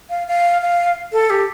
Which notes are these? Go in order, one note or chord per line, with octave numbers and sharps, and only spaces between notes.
F5
F5
F5
A4
G4